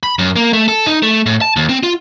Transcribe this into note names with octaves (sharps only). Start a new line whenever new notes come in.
B5
F#2
A#3
A3
A4
D#4
A3
A2
A5
D#2
C4
F4